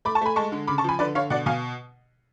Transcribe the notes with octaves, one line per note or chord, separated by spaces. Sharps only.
A3 B5 D6
A5 C#6
A3 G#5 B5
G#3 A5 C#6
D3
C#3 B5 D6
A5 C#6
F3 G#5 B5
D3 B4 D5
D3 C#5 F5
B2 D5 F#5
B2 F5 G#5